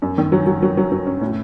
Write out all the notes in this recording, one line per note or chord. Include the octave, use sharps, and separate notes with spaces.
F#2
D#3
F#3
F#3
F#3
F#3
F#3
C#4
A2